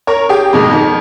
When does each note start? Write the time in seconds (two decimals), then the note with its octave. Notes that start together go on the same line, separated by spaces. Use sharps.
0.07 A#4 C#5
0.29 G4 G#4
0.53 F2 G#2 B2 D#3 G#3
0.71 F2 D#3